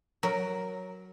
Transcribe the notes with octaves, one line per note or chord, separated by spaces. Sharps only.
F#3 A#4